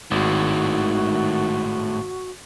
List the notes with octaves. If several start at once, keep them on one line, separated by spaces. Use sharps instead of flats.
G#1 A2 D#3 G#3 F#4